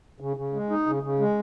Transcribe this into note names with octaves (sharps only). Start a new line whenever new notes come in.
C#3
C#3
G#3
D#4
C#3
C#3
G#3